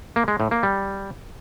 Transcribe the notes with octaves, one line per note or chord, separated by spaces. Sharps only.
A#3
G#3
A2
A#3
G3